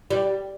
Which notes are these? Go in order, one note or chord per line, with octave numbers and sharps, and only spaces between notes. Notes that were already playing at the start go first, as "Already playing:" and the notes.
G3